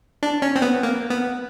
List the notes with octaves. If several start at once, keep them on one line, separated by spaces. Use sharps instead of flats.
D4
C#4
C4
B3
A#3
B3